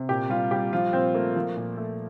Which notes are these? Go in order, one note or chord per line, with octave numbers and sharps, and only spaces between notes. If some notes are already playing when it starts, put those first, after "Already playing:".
Already playing: C3
A#2 G4
G3 F4
G3 G4
F3 F4
A#2 C4
A3 A#3
F3
A#2
A3